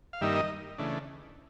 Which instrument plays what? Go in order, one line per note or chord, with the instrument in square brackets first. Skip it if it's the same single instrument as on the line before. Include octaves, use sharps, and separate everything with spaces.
[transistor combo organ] F5
G2 D#3 G3 A#3 D#4 E5
D#5
C#3 E3 A3 D4